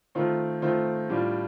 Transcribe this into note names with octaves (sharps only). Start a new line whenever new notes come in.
D#3 A3 C4 F4
D#3 A3 C4 F4
A2 G3 D4 F4